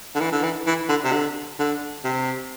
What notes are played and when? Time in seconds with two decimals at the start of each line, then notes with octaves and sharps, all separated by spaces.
0.15 D3
0.20 E3
0.32 D3
0.43 E3
0.67 E3
0.88 D3
1.05 C3
1.12 D3
1.59 D3
2.04 C3